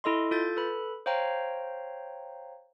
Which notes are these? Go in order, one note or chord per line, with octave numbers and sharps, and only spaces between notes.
E4 A4 D#5 C6
F4 A4 G6 A6
A4 B4 B5
C5 C#5 F5 G5 A#5